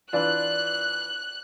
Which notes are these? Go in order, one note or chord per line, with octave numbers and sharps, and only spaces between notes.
E3 D4 F4 F#6